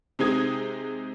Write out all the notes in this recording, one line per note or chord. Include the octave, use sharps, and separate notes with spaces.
C3 G#3 C4 D#4 D#6 G#6